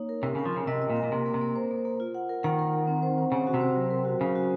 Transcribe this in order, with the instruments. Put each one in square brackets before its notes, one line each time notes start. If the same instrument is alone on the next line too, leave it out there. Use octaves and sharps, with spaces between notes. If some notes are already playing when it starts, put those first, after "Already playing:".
Already playing: [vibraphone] A#3 D#4 C#5
A#4
[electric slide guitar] C3 [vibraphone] A#4
[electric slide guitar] C#3 [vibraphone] A#4
[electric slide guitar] F3
[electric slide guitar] C#3 [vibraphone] A#4
[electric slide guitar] C3 [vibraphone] D#5
[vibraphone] D#5
[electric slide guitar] A#2
[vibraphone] A#4
[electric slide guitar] A#2
[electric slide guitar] C3 [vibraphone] A#3
[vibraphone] A#3
[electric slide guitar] C3
[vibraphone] A#3
C5
A#3
A#3
F4
F#5
A#4
[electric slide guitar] D#3 [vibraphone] F#5
[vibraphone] A#4
F#5
C4
C5
C5
[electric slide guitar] C#3 [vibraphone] C4
[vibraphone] F#4
[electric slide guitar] C3
[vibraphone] C5
F#3
A#4
F#4
[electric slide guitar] C#3 [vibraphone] F#3
[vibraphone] F#4